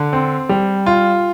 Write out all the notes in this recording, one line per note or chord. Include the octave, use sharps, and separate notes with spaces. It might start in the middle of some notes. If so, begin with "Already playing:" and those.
Already playing: D3
C4
G3
F4